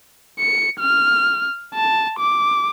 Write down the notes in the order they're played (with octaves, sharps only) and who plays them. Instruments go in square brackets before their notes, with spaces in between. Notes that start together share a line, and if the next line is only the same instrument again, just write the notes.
[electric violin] C#7
F6
A5
D6